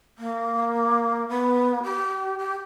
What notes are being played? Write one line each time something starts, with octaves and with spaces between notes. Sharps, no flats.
A#3
B3
G4
G4